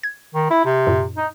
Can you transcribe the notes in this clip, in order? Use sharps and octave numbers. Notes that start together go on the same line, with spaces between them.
G#6
D#3
E4
C3
F#2 A#2
D#4